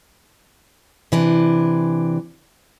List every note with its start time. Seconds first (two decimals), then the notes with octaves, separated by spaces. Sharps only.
1.12 C3 E3 D4